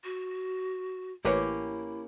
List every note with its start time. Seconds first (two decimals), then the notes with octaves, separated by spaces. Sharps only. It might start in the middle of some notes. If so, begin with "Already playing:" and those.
0.04 F#4
1.25 A1 A#3 C#4 E4 G4 B4 C#5